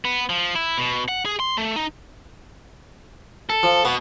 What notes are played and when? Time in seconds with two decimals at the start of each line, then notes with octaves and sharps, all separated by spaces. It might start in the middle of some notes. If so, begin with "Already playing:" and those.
0.05 B3
0.30 F3
0.55 E4
0.78 B2
1.09 F#5
1.25 G#4
1.40 C6
1.58 A3
1.76 D#4
3.49 A4
3.63 F3
3.85 B2 B3